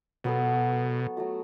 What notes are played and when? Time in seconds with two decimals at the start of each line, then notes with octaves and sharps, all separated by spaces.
0.24 B2 F#3 B3 A4
1.17 F#3 A3 F#4